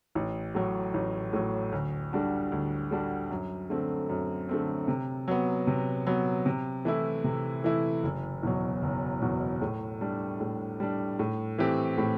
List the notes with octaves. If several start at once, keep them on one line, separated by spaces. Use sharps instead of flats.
A1
A2 F#3
A1
A2 F#3
D2
D3 G3 D4 F#4
D2
D3 G3 D4 F#4
F#2
D3 A3 C4
F#2
D3 A3 C4
C3
F#3 B3
C3
F#3 B3
C3
E3 A3 E4
C3
E3 A3 E4
F#1
E2 B2 F#3
F#1
E2 B2 F#3
A2
G3 D4
A2
G3 D4
A2
E3 A3 C4 G4
A2